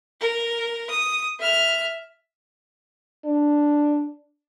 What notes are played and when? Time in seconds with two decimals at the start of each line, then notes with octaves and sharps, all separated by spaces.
0.21 A#4
0.90 D#6
1.39 E5 F6
3.25 D4